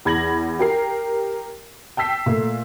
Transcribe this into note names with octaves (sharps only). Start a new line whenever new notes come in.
E2 B5 G#6 A#6 F#7
G4 A#4 C7
G5 A5 E6 B6 C7
A#2 A3